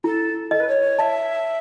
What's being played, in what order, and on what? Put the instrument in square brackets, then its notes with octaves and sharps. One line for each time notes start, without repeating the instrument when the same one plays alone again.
[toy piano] E4 [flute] A4
[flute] A4 [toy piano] D#5
[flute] B4
C#5
[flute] E5 [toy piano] A5